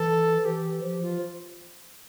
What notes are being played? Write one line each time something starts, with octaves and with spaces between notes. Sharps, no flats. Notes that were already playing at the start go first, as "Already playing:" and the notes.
Already playing: E3 A4
E3 G4
F3 G4
F4